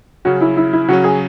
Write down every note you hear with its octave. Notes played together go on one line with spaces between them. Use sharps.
C#3 F#3 C#4 F#4
E4
E4
E4
C#3 F#3 C#4 F#4
G#4